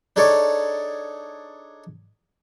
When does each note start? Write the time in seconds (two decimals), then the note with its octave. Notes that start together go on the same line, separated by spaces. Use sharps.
0.16 D4 D#4 G#4 A4 C#5 D5